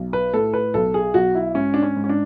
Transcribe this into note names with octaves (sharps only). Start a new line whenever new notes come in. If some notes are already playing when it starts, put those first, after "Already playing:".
Already playing: B1
B4
A2 A4
B4
B1 A4
G#4
B1 F#4
E4
G#2 C#4
D4
C#4
G#2
C#4
D4